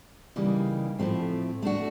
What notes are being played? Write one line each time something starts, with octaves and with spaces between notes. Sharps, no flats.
C#3 E3 G3 A#3 D#4
A2 F3 A3 C4
A3 D4 F#4